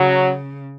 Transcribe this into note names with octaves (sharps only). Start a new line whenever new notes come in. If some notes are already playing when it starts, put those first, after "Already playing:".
Already playing: C#3 F#3